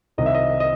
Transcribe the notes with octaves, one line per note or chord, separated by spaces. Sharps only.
C2 C3 D#3 D#5
E5
D#5
D#5